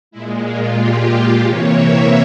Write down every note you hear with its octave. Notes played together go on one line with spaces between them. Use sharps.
A#2 G#3 E4
F4
G4
F4
C3 E3 A#3 C#5
E5